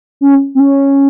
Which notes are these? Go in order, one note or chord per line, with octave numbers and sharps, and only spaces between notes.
C#4
C4
C#4